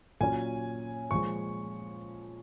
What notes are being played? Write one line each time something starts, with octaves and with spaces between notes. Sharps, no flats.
A#2 F#3 C#4 G#5
A#2 F3 G#3 C#6